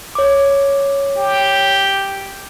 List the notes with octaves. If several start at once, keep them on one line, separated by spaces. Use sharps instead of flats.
C#5 D6
G4